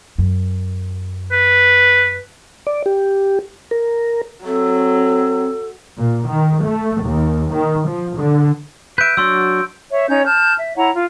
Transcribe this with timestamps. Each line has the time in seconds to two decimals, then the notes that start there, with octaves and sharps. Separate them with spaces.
0.18 F#2
1.32 B4
2.67 D5
2.86 G4
3.71 A#4
4.45 F#3 C4 A4
5.98 A#2
6.28 D#3
6.65 A3
7.04 D#2
7.54 D#3
7.87 F3
8.18 D3
8.98 B4 E5 G6 D7
9.17 F#3 D4 F#4 C6 E6
9.91 C#5 E5
10.08 C#4 D#4 C#5 G6
10.25 A5 F6 G6
10.57 E5
10.77 E4 C#5 F#5 A#5
10.94 F4